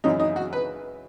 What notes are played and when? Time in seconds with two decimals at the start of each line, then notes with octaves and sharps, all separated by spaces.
0.04 F#2 C#3 E3 G#3 C#4 D#4
0.20 D#4
0.36 F#4
0.53 B4